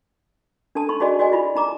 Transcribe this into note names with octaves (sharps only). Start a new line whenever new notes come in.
D4 A4 A5
D#4 B5 C#6
D#4 F#4 G#4 D5 D#5 G#5
F#4 D5 D#5 G#5
E4 F4 B5
D#4 A#5 D6